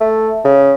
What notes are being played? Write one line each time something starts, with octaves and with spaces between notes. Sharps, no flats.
A3
C#3